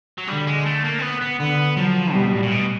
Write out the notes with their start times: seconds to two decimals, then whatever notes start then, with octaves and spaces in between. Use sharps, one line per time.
0.18 F#3
0.28 D3 G3
0.47 G#3
0.66 A3
0.84 A#3
0.99 C4
1.02 B3
1.21 B3
1.39 D3 B3
1.77 F3 F#3
2.14 B2 G3
2.32 A2
2.43 A#2
2.51 B2